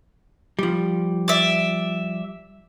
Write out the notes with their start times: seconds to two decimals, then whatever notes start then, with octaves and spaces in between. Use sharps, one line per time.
0.59 F3 G3
1.28 D5 E5